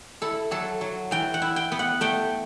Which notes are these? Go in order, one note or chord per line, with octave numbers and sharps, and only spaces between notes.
E4 A4
F#3 A4
F#3
E3 G5
F#5
E4
G5
B3
F#5
A3 G5